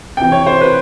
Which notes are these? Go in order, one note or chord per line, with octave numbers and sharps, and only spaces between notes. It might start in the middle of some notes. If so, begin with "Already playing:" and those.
C3 E3 G5
C#5
C5
B4